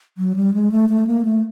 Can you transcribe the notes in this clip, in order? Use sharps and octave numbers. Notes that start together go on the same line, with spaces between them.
F#3
G3
G#3
A3
A3
A#3
A3